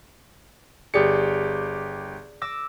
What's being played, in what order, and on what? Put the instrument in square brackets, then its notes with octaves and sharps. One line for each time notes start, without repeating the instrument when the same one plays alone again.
[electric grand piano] G1 G4 C#7 [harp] G#4 D5
[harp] D6 E6 A#6